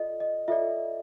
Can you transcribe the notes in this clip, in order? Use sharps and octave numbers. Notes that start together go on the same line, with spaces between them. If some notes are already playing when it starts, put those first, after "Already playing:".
Already playing: F4 A4 D5 D#5
D#5
F4 A4 D5 E5